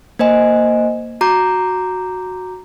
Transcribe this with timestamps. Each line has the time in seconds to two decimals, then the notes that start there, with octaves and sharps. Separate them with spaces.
0.19 A#3 C5 D#5 G#5
1.21 F#4 A#5 D6 G6